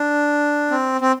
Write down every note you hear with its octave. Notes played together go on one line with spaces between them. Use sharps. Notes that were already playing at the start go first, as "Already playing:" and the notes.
Already playing: D4
C4
C4